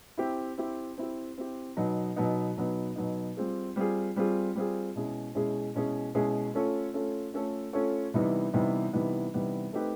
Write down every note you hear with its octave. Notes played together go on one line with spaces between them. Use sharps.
C4 E4 G4
C4 E4 G4
C4 E4 G4
C4 E4 G4
B2 F#3 B3 D#4
B2 F#3 B3 D#4
B2 F#3 B3 D#4
B2 F#3 B3 D#4
G3 C4 F4 G#4
G3 C4 F4 G#4
G3 C4 F4 G#4
G3 C4 F4 G#4
B2 G#3 C#4 E4 G#4
B2 G#3 C#4 E4 G#4
B2 G#3 C#4 E4 G#4
B2 G#3 C#4 E4 G#4
A3 C#4 F4 A4 C#5
A3 C#4 F4 A4 C#5
A3 C#4 F4 A4 C#5
A3 C#4 F4 A4 C#5
C3 E3 G3 B3 D#4
C3 E3 G3 B3 D#4
C3 E3 G3 B3 D#4
C3 E3 G3 B3 D#4
A3 C4 D#4 G4 B4